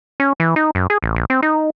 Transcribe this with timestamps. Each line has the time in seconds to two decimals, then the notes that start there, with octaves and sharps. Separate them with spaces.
0.20 C#4
0.40 E3
0.56 D#4
0.75 F#2
0.90 G#4
1.02 A1
1.16 A#1
1.30 C4
1.43 D#4